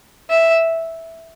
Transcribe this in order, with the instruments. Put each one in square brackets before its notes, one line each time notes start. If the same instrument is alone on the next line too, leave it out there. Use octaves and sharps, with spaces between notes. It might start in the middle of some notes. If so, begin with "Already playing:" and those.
[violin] E5